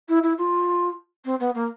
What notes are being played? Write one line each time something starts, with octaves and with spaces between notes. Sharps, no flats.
E4
E4
F4
C4
B3
A#3